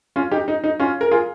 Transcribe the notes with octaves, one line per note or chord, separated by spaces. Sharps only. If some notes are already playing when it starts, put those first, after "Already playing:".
C#4 F4
D#4 G4
D#4
D#4
C#4 F4
A#4
F4 G#4